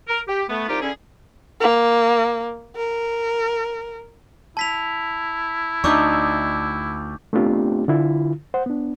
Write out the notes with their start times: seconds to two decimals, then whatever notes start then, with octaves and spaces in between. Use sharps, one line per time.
0.08 A#4
0.28 G4
0.49 A3 B3
0.69 C2 D#4 F4 G4
0.82 D3 C#4 E4 G#4
1.60 A#3
2.76 A#4
4.57 E4 A5 B6 F7
5.84 D2 D4 D#4 E5 C#6 D6 G6
7.33 A3 B3 C4 D4 F4 G4
7.88 D3 E4 F4
8.54 C5 F#5
8.66 B3 D4